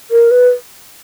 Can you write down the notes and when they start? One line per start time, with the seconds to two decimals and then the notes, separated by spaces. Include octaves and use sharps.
0.11 A#4
0.31 B4